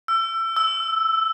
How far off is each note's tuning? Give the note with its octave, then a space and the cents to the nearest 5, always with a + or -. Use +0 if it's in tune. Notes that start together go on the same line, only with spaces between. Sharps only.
E6 +25
E6 -5